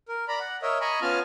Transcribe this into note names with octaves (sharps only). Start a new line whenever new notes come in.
A#4
D5 A#5 B5
F#5
A#4 C#5 D#5 E5
D#5 G#5 A#5 B5 C#6
B3 C#4 F4 G#5 A5 F6